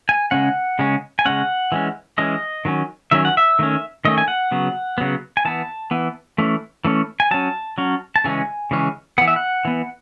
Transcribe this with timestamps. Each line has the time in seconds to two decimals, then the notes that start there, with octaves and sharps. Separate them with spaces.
0.09 G#5
0.31 C#3 G#3 C#4 F#5
0.79 C#3 G#3 C#4
1.19 G#5
1.25 C#3 G#3 C#4 F#5
1.72 E3 G#3 C#4
2.18 E3 G#3 C#4 D#5
2.65 D#3 F#3 C#4
3.11 D#3 F#3 C#4 E5
3.25 F#5
3.37 E5
3.59 D#3 A3 C#4
4.05 D#3 A3 C#4 D#5
4.18 G#5
4.28 F#5
4.51 C#3 F#3 B3
4.98 C#3 F#3 B3
5.37 G#5
5.45 E3 B3 A5
5.91 E3 B3
6.38 E3 A3 C#4
6.85 E3 A3 C#4
7.20 G#5
7.31 F#3 C#4 A5
7.78 F#3 C#4
8.16 A5
8.24 C#3 E3 G#3 C#4 G#5
8.71 C#3 E3 G#3 C#4
9.18 E3 B3 F#5
9.28 E5
9.36 F#5
9.65 E3 B3